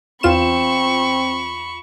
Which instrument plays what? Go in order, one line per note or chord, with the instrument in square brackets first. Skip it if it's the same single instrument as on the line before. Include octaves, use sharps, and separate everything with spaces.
[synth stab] E2 F4 E7 [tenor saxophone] C4 [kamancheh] B5 C#6